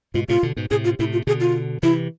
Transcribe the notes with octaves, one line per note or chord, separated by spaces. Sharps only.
G#2 B2 F4
A2 C3 F4
B2 D3
G#2 B2
A2 C3 G#4
F4
A2 C3 E4
F4
B2 D3 G#4
F4
C3 E3 E4